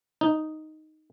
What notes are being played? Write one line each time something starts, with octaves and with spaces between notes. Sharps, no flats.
D#4